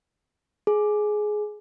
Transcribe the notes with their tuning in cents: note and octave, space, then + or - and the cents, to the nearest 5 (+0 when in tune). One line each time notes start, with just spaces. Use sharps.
G#4 +15